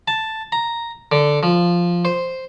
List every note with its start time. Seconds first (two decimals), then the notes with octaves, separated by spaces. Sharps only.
0.08 A5
0.52 A#5
1.12 D3
1.43 F3
2.05 C5